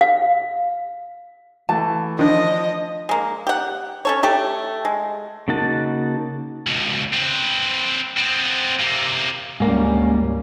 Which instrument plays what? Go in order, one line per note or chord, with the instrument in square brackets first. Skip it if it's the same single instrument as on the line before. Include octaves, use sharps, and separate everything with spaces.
[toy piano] F5
[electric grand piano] E3 A3 [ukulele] A5
[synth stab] D#3 D4 [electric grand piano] F3 [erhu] D#5
[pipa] G#3 A#3
G4 F#5
C#4 A4 C#5
A3 G4 A4
G#3
[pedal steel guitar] C#3 A#3 D#4 F#4 A5
[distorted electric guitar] C#2 B2
C4 B4
B3 C4
C3 A#3
[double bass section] D2 G3 C#4 [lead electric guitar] G#2 A#3